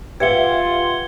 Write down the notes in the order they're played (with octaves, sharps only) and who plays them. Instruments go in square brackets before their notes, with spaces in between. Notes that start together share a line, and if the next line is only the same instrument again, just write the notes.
[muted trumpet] F4 [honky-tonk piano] G4 E5 [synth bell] B4 F#5 [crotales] G#6 C#7 G7